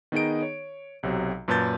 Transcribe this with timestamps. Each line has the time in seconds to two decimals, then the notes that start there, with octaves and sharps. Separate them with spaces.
0.12 D#3 B3 D#4 G#4 D#5 D7
0.42 C#5
1.03 B1 C3 F#3
1.48 F#2 A#2 B4 A5 G6 A6